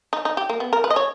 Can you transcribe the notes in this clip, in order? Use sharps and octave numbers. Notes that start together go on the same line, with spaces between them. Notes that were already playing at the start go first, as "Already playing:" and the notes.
D#4
D#4
G4
A#3
B3
A#4
B4
D#5
C#5